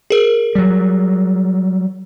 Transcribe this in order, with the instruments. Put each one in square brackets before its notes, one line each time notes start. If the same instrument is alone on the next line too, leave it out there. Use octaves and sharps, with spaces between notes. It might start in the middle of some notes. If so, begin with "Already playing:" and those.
[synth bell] G#4 A#4
[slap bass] F#3 G3